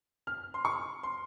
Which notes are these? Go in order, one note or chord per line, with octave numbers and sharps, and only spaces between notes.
F6
C6
C#6
C6